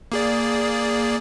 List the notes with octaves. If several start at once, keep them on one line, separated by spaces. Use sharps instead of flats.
A#3 G#4 D5